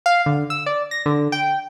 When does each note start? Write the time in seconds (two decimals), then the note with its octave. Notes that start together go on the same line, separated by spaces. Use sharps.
0.06 F5
0.26 D3
0.50 E6
0.66 D5
0.91 A#6
1.06 D3
1.32 G5